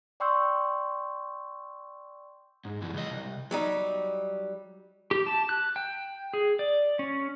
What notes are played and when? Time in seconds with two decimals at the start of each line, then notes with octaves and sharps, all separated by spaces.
0.20 D5 G5 C6 C#6 E6 G6
2.65 G#2
2.81 F#2 E3
2.94 C#2 D#5
3.10 C2
3.51 F#3 G3 D#4
5.11 G4
5.26 A5
5.49 F#6
5.76 G5
6.34 G#4
6.59 D5
6.99 C#4